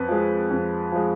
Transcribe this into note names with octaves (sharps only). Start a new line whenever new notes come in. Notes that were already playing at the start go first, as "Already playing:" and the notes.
Already playing: F2 B4
F3 G#3
F2
F3 G#3